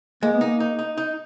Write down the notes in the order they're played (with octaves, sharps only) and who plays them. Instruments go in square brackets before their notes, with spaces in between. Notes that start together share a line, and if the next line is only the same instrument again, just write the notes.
[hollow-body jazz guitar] G#3 [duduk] A#3
[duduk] B3
[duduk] A#3 [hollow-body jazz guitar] D#4
[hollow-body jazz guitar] D#4
D#4
D#4